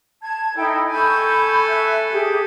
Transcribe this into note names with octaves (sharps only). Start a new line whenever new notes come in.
A5 G#6
D#4 E4 A4 G5
A4 G#5 B5 C#6 G6
E5 F#6
G4 G#4